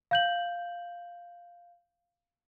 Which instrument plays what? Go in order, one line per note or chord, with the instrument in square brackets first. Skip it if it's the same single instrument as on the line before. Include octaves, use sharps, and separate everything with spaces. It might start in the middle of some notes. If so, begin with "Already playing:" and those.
[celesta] F5 G6 F#7